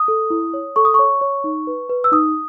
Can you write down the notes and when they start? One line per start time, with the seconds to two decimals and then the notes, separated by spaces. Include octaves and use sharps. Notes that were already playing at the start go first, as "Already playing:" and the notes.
Already playing: D#6
0.08 A4
0.30 E4
0.54 C#5
0.76 A4 C#6
0.85 D#6
0.94 C#5 C#6
1.21 C#5
1.44 D#4
1.67 B4
1.90 B4
2.04 E6
2.12 D#4 D#6